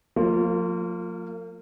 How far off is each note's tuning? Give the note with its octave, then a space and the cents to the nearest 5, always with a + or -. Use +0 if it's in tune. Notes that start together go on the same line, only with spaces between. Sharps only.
F3 +35 A#3 -40 F4 +0